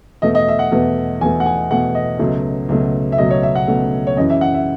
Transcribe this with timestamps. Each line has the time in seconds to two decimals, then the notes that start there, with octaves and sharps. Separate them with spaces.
0.22 E2 B2 A3 D#5
0.35 D#5
0.48 E5
0.59 F#5
0.72 E2 B2 A3
1.21 E2 B2 A3 G#5
1.40 F#5
1.46 G#5
1.70 E2 B2 A3 F#5
1.95 D#5
2.19 C#2 B2 F#3 A3
2.69 C#2 B2 F#3 A3
3.12 E5
3.18 C#2 B2 F#3 A3 D#5
3.31 C#5
3.43 E5
3.55 F#5
3.68 C#2 B2 F#3 A3
4.07 C#5
4.17 F#2 C#3 E3 D#5
4.30 E5
4.41 F#5
4.54 E5